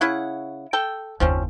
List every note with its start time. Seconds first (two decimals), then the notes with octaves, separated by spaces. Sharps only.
0.01 C#3 E4 F#5
0.73 A4 G5
1.20 F#1 D#2 F3 C4 C#4